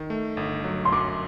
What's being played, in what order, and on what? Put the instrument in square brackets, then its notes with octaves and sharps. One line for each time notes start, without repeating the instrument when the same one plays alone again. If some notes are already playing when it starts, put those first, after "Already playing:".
Already playing: [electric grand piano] D#3
A3
G1
F#3
[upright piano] C6
[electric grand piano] F#2 [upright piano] D6